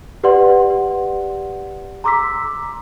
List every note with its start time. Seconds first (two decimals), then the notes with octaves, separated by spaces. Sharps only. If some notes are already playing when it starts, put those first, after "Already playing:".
0.24 G4 B4 D5 F#5 C6
2.04 A#5 C6 D6 E6 B6